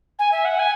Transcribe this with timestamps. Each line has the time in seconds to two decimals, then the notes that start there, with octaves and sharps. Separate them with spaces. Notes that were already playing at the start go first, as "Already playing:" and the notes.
0.19 G#5
0.32 E5
0.45 F#5
0.59 G#5